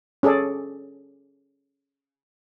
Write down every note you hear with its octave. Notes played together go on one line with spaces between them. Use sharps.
C#4 G#4 A4 D5